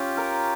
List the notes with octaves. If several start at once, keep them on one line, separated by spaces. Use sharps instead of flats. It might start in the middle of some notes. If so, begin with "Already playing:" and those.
Already playing: C#4 F4 G4
A#4